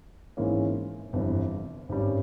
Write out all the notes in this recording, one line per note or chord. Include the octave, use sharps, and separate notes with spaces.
G#1 G#2 E3 A#3 C#4
G1 F2 C3 E3 G3
G#1 G2 G3 C#4